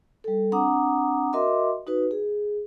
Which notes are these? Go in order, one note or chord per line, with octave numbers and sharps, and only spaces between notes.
G3 A4
C4 D4 F#5 A#5 D6 D#6
F#4 A#4 D#5 E5 C6 D6
D#4 F#4 B4
G#4